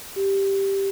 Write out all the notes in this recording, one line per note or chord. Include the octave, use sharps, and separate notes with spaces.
G4